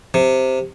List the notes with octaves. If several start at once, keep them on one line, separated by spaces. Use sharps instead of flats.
C3